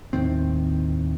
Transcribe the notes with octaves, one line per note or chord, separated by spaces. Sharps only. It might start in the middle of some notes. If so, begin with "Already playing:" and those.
D#2 A2 D#3 C4